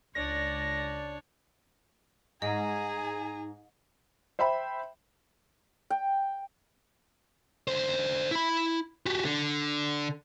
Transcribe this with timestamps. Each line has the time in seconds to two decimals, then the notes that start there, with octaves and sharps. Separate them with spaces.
0.15 C#2 D4 C#5 D5 A#6
2.42 G#2 G#4 D#5 G#5 A#5
4.39 C5 E5 G5 B5
5.90 G5
7.68 D3 C5
8.31 E4 B5
9.06 F#4 G4
9.25 D3